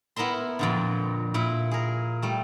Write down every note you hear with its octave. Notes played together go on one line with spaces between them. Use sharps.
B3 E4 A#4 E5 C6
F2 A#2 D3
A#2 E4
G#4 A#4
G3 A3